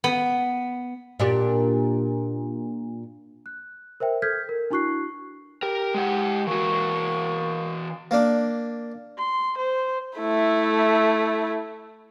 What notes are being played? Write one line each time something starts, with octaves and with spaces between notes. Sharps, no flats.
B3
A#2 D4 G4
F#6
A#4 C5 E5 G5
A4 F6 G6 G#6 B6
A#4
D4 E4 F#4 C#6 F#6 C7
G4 A#4
G#3 F#5
E3 A#3 F#4 C#6
A#3 D4
C6
C5
A3 E4